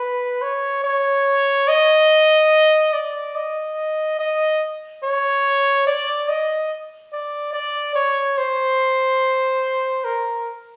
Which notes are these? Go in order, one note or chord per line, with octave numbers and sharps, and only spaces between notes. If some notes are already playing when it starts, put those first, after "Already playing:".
Already playing: B4
C#5
C#5
D#5
D5
D#5
D#5
C#5
D5
D#5
D5
D5
C#5
C5
A#4